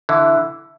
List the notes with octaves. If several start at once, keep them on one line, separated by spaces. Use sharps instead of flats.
D3 E3 E4